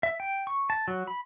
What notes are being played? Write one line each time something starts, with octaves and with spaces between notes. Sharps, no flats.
E5
G5
C#6
A5
F#3
B5